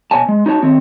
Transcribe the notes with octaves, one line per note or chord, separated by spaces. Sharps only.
B2 C#5 G#5 A5
G#3
D#4 F#4 C#5 A5
D#3 C4 C#5